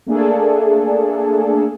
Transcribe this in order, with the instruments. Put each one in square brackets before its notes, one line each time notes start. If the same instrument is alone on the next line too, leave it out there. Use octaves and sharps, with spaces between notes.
[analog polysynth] A3 A#3 D4 G#4 A4